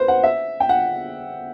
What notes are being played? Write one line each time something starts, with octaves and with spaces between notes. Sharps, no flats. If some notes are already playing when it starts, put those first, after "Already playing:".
Already playing: B4 C5
F#5
E5
G5
F#5